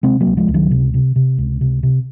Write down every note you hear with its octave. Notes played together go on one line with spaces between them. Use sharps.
C3 G#3 C4
F#3 A#3
C#2
F3 G#3
C#2
D#3 F#3
C3
C3
C3
C#2
C3
C3